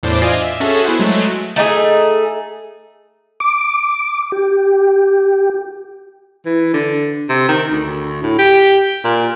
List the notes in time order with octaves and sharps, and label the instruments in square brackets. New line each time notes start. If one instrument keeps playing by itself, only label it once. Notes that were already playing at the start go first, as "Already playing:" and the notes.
[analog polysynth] E2 A2 D4 C5 D6
F4 D5 D#5 F5 G#5
E5
C#4 F#4 G#4 A4 E5
B3 E4 G#4 C5 F#5
F#3 G#3 A3
[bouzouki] A3 D#4 F#4 G#4
[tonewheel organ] D6
G4
[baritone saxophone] E3
D3
C3
D#3
D2
A2
G4
A#2